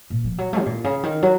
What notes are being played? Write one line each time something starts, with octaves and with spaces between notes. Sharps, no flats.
A#2
F3
F#3
A3
C3
A#2
C#3
D#3
F#3